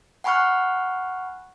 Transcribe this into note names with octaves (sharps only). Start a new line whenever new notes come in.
F#5 G#5 B5 C#6 F6 F#6